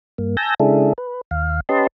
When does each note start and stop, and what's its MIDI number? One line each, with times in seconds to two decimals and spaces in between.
0.18 0.36 43
0.18 0.36 58
0.37 0.54 80
0.37 0.54 81
0.37 0.54 88
0.37 0.54 91
0.37 0.54 94
0.60 0.93 49
0.60 0.93 56
0.60 0.93 62
0.60 0.93 64
0.60 0.93 68
0.60 0.93 69
0.98 1.21 71
1.31 1.60 39
1.31 1.60 77
1.69 1.87 61
1.69 1.87 67
1.69 1.87 71
1.69 1.87 75
1.69 1.87 81
1.69 1.87 84